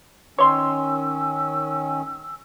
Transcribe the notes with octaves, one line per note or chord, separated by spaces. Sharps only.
D#3 C#4 C#5 C6 E6